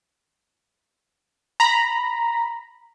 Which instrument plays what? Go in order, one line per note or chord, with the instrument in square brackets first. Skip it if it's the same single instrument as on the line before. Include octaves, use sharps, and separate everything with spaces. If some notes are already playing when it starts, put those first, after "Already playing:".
[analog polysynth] A#5 B5